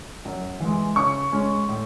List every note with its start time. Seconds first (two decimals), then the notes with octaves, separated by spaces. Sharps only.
0.25 F#2
0.60 E3 G#3
0.96 C#3 C#6
1.32 G#3 C#4
1.69 A2